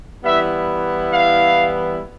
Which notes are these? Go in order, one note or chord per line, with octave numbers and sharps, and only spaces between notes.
E3 G3 B3 E4 E5
F5